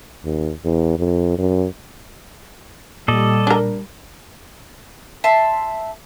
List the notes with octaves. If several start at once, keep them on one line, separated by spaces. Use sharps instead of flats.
D#2
E2
F2
F#2
A#2 G3 A4 D5 D#5
D4 A#4
E5 A5 C6